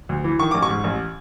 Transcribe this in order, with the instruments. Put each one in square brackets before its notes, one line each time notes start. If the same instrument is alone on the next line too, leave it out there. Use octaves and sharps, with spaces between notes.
[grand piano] D2
E3
D#3 C#6
A1 D6
C#6
G#2
A1